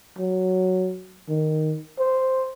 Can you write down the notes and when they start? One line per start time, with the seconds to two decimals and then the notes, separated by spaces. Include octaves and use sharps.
0.18 F#3
1.29 D#3
1.99 C5